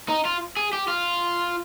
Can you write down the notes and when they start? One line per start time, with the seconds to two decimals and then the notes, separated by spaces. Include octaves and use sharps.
0.09 D#4
0.25 F4
0.57 G#4
0.73 G4
0.88 F4